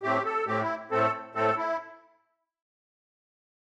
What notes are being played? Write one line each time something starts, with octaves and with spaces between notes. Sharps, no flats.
A2 A3 C4 G4
A4
A2 A3 C4 G4
E4
A2 A3 C4 A4
A2 A3 C4 A4
E4